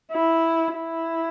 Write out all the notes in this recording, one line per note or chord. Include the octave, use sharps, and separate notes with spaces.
E4
E4